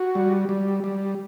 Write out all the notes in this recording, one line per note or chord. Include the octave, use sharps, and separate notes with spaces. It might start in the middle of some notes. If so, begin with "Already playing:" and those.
Already playing: F#4
G3
G3
G3